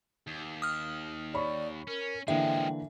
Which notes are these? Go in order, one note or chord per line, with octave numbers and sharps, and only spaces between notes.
D#2
D#6 F6
C#5 D5 B5 C#6
C#4 A#4
D3 E3 F3 G#3 A#3 E5 G5